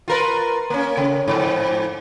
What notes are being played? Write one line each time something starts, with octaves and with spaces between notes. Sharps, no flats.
F4 A#4 B4
A#3 C#4
C#3
F2 G#2